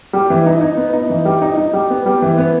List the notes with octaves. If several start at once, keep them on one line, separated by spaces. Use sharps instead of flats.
G3
E3
D#4
D#4
B3
D#4
E3
G3
D#4
D#4
G3
B3
G3
E3
B3